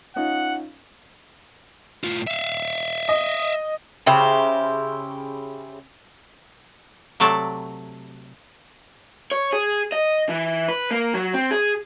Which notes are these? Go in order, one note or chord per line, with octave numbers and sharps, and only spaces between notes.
C#4 D#4 F4 F#5
A2 F4
E5 F5
D#5
C#3 E4 G4 C5
C3 F#3 A3 A4 D5 A5
C#5
G#4
D#5
E3
B4
A#3
F#3
C4
G#4